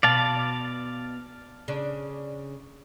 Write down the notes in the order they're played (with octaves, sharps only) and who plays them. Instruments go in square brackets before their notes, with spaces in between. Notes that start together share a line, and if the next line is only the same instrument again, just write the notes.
[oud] B2 [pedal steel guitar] D5 F5 A5
[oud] C#3 D4